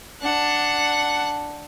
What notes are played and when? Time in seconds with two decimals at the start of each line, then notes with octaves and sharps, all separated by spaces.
0.21 D4 F#5